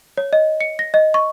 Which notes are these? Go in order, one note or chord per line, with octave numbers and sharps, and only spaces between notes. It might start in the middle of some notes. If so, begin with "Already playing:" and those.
C#5
D#5
C#7
A#6
D#5
C#6